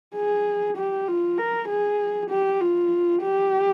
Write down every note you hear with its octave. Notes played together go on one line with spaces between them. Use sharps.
G#4
G4
F4
A#4
G#4
G4
F4
G4